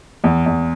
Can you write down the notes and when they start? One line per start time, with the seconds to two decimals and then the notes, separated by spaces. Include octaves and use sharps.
0.24 E2
0.46 E2